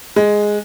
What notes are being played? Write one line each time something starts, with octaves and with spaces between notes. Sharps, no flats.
G#3